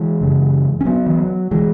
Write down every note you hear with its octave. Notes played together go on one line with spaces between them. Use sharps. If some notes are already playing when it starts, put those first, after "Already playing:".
Already playing: E3 G#3
F#2 C#3
C#4
F#3 B3
E3
F#3
B2 E3 G#3